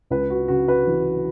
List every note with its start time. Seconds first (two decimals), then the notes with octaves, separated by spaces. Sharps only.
0.10 C#2 B4
0.30 F#4
0.48 C#3 F#4
0.68 B4
0.87 E3